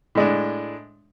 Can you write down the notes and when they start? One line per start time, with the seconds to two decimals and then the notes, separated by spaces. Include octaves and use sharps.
0.15 A2 G#3 D4